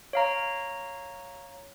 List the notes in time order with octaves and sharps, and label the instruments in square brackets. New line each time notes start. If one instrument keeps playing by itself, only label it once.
[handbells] C#5 F5 A#5